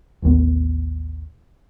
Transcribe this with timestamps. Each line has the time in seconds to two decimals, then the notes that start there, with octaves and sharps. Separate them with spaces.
0.22 A1 D#2 D#3 B3